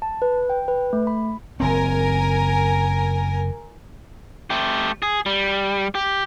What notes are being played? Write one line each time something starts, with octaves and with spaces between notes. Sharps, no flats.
A5
B4
G5
B4
A3
B5
F#1 C4 A#4 G#5
A3 G4
G#4
G3
G4